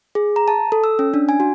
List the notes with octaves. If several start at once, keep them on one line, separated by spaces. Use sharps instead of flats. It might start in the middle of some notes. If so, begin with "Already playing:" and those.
G#4
A#5
A5
A4
E6
C#4
D4
G#5
F#4